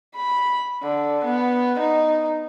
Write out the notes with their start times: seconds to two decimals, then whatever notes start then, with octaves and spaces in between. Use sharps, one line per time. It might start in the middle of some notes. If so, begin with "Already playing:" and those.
0.16 B5
0.83 D3
1.25 B3
1.80 D#4